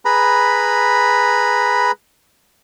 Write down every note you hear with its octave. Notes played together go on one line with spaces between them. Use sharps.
G#4 B4 A#5 B5